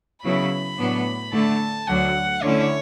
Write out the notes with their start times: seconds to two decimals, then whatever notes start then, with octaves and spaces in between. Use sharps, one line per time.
0.24 C#3 F#3 B3 E4 B5
0.78 A2 F#3 B3 D4
1.33 D3 A3 E4 A5
1.87 D2 D3 F#3 F#5
2.42 D3 A3 C#4 E4 C#5